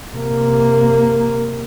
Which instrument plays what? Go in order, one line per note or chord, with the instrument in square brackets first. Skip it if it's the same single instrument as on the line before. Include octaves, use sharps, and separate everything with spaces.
[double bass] C3 A#3